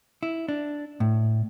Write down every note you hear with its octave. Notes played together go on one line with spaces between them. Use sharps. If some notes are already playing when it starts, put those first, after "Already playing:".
E4
D4
A2